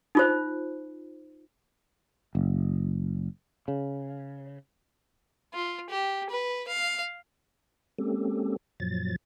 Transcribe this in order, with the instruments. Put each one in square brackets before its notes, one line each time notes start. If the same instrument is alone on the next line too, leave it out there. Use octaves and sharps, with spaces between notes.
[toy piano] D#4 F4 C5
[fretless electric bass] F#1
C#3
[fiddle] F4
G4
B4
F5
[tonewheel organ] G#3 A#3 C4 C#4 G4 A4
F#2 A#2 F3 F#3 A6